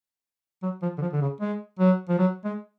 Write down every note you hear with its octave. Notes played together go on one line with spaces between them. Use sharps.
F#3
F3
D3
F3
D3
C#3
G#3
F#3
F3
F#3
G#3